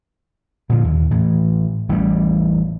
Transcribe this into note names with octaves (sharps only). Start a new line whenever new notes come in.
A#2 D3 E3 F3
D#2
A2 E3
A1 E3 F#3 G3